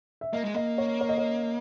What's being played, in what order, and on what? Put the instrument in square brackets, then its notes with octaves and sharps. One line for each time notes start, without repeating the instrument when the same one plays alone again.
[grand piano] E5
[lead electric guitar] A#3 [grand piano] D#5
[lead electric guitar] G#3
[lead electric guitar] A#3 [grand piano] D#5
[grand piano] C#5
C#5
D#5
C#5